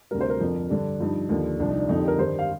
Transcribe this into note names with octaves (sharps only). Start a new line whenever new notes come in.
D2 C3 G3 A#4
C5
A#4
F2 D3 F3
G2 D3 G3 D4
G2 F3 D#4
D#2 D3 F3
C2 C3 F3 D4
D#4
D4
F2 D3 F3 D#4
G4
A#4
G2 D#3 G3 C5
F5